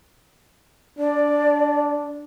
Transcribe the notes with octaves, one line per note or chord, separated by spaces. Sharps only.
D4 D5